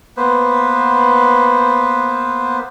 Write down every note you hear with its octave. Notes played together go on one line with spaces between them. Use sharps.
A#3 B3 B4 C5